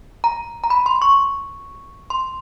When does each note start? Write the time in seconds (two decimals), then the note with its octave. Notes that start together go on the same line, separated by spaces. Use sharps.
0.24 A#5
0.64 A#5
0.70 B5
0.86 C6
1.02 C#6
2.10 C6